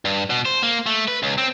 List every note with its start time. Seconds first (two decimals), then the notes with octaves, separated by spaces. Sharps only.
0.05 G2
0.30 B2
0.45 C5
0.63 A#3
0.86 A3
1.08 B4
1.23 C#2
1.38 C4